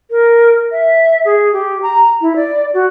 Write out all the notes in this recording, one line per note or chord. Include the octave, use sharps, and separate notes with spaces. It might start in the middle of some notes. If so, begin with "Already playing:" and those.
A#4
E5
G#4
G4
A#5
E4
D5
F#4